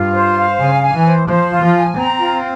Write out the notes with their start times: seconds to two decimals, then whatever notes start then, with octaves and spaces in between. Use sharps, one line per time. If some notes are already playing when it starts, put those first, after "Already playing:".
Already playing: G2 F4
0.15 C5
0.37 F5
0.60 C#3 G#5
0.82 G#5
0.94 E3
1.06 C5
1.28 F3 C5
1.51 F4
1.62 F3
1.74 G#5
1.97 C4 A#5
2.20 F4